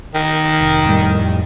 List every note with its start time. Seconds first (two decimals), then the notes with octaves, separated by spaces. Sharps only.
0.14 D#3
0.61 F1
0.85 F2 A2 G3